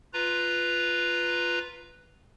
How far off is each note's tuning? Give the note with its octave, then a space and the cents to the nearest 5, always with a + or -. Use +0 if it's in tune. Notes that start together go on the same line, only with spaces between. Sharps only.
F4 +0 B4 +0 A#5 -5